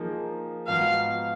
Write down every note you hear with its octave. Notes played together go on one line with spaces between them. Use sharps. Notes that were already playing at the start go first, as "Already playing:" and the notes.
Already playing: F3 A#3 D#4 G#4
G#2 F3 B3 D#4 F#4 F5